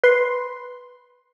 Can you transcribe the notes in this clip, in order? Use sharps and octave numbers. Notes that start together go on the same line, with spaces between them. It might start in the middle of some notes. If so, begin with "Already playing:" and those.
B4 C6